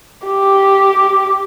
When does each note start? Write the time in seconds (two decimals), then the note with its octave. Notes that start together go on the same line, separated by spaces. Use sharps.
0.27 G4